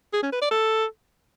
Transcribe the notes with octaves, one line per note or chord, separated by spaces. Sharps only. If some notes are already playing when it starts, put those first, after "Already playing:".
G#4
C#4
B4
D5
A4